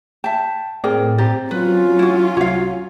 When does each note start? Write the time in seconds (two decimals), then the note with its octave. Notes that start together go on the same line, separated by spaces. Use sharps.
0.24 E5 G5 A5
0.84 A2 C4 G#4 A#4 D5 G5
1.18 C4 G4 A#5 A6
1.51 F#3 C#4 F4 B4
1.99 E4 F#4
2.37 C2 F#4 C#5 F5 G#6